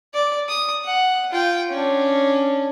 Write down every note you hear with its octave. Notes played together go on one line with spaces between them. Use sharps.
D5
D#6
F#5
F4 G5
C#4 D4